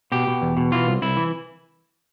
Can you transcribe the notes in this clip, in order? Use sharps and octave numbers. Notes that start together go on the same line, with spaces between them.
B2 G4
B2
E2
B2
E3 F4
C2
C2 E4
E3